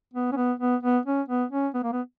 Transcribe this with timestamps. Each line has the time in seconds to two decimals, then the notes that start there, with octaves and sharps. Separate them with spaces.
0.13 B3
0.32 C#4
0.36 B3
0.60 B3
0.83 B3
1.06 C#4
1.28 B3
1.52 C#4
1.74 B3
1.83 A#3
1.92 B3